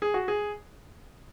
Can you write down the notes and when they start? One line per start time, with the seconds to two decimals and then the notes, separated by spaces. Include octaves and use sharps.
0.02 G#4
0.14 F#4
0.28 G#4